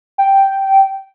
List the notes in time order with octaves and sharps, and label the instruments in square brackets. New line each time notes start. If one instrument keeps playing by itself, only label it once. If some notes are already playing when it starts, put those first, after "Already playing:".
[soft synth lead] G5